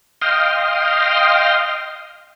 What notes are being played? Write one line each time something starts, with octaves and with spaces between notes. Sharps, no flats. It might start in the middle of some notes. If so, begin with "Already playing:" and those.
D#5 F5 G5 C6 D#6 F6